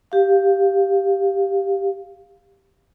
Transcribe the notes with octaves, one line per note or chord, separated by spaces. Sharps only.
G4 F5